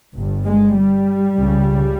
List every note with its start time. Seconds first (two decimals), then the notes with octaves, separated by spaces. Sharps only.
0.16 G1 G2
0.45 G#3
0.76 G3
1.35 C#2 C#3